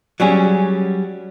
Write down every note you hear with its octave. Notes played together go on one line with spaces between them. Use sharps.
F#3 G3 C#4 G#4